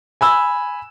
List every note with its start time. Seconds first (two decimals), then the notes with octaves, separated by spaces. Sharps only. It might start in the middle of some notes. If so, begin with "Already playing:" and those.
0.21 G#5 B5 E6